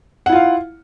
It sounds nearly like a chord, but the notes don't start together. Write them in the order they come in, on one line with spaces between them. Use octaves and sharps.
F#5 E4 F4 F5